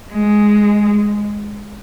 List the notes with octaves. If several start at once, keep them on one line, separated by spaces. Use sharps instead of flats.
G#3